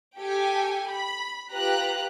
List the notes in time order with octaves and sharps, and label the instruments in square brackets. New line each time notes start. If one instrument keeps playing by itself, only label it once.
[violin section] G4 A4 G5 G#5
B5
F4 G4 B4 A#5 F#6